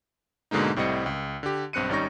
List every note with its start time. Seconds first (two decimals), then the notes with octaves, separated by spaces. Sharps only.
0.51 G#2 B2 D3 G#3 A#3 D#4
0.76 C2 A2 G3 C4 D#5 C#7
1.06 C#2
1.43 D3 G4
1.73 B1 G2 C4 F#6 C#7 D#7
1.89 G#1 G3 C#4 D#4 C#6 A#6